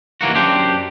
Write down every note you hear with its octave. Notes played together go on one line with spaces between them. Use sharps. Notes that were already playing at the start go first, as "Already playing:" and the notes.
D#2 E3 A#3 F#4
F#2 D4 G4 C5